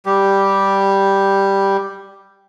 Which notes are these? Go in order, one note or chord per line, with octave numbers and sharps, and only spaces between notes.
G3 G4